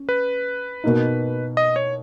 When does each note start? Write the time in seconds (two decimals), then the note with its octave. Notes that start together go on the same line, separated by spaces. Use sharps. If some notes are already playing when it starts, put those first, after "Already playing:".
Already playing: C#4
0.09 B4
0.84 B2 A#3 D#4
1.57 D#5
1.76 C#5